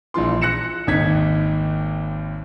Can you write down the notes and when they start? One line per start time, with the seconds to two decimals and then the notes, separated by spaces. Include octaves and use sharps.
0.14 A#1 E3 F4 C6
0.41 F#6 A#6 C#7 E7
0.87 G#1 D#2 D#4 G#6 B6